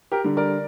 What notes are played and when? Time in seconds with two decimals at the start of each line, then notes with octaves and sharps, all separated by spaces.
0.12 G4 A#4
0.24 D3 G3
0.37 A#4 D5